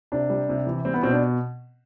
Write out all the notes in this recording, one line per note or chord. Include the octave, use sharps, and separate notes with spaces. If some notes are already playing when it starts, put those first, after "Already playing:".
C3 D4
G3
C3
E3
G3 C4
B3
B2 C4
D4